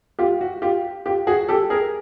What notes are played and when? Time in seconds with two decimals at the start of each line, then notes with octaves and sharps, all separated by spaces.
0.19 F4 G4
0.41 F#4
0.62 F4 G4
1.05 F4 G4
1.27 F#4 G#4
1.48 G4 A4
1.70 G#4 A#4